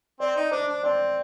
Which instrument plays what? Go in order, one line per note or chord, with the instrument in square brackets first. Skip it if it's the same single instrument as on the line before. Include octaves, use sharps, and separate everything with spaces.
[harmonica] C4 [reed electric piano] D5
[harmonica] D#4
[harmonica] D4 [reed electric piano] C5
[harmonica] D4
[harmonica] C4 [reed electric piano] D5